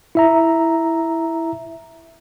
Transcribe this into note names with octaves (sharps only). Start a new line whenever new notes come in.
E4 E5 A#5